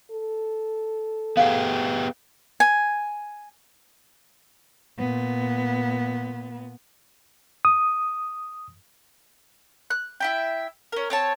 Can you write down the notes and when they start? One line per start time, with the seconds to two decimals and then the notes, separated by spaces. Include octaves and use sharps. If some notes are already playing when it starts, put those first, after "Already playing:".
0.11 A4
1.37 B3 G4 G#4 F5 F#5
2.60 G#5
4.99 A#2 B3
7.65 D#6
9.90 F#6
10.20 E4 E5 G5
10.92 C#4 A#4
11.10 C4 C#5 A5